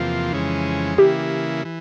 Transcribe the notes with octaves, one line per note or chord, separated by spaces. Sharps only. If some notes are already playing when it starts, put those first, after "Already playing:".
Already playing: E2 C3 F3 A#3 F4
F2 C#3 E3 G#3 C#4
C#3 E3 A#3 E4 G4
E3